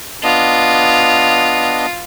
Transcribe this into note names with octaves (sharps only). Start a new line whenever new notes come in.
B3 D4 F4 D#5